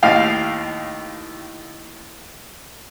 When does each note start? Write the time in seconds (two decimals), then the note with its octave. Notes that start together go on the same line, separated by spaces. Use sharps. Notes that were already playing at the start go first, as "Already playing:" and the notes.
0.03 D#2 A2 F5 G5